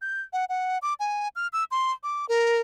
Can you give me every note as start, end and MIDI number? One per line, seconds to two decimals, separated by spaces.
0.02 0.22 91
0.33 0.45 78
0.49 0.78 78
0.82 0.94 86
1.00 1.28 80
1.36 1.48 89
1.53 1.64 88
1.71 1.92 84
2.03 2.25 86
2.29 2.61 70